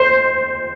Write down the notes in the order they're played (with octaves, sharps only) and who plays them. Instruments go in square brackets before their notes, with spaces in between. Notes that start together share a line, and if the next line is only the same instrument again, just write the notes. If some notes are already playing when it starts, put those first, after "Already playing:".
Already playing: [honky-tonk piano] C5